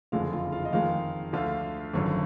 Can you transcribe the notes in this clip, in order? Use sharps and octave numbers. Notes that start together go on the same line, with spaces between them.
F#1 F2 D3 G#3 F4 F5
F4 F5
F4 F5
D#5
F2 D#3 G#3 F4 F5
D2 D3 F3 F4 F5
G#1 F#2 D3 F3